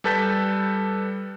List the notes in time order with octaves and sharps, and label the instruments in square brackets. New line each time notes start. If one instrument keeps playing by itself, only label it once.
[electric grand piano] G3 A4 B4 A5 G6 B6